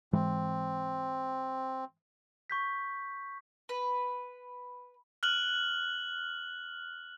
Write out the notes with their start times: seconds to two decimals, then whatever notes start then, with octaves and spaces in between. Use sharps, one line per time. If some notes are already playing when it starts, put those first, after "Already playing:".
0.13 G#2 E3 G#3 C4
2.50 C#6 G6 B6
3.69 B4
5.23 F6 F#6 F#7